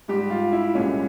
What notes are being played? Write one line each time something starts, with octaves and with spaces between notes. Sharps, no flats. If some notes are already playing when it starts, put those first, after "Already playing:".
G#2 G3 G4
F4
E4
C2 A#2 G#3 C#4